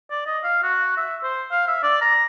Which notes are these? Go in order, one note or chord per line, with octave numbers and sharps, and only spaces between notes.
D5
D#5
F5
F#4
E5
C5
F5
E5
D5
A#5